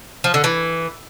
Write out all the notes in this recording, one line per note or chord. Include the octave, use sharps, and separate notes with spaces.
F3
D3
E3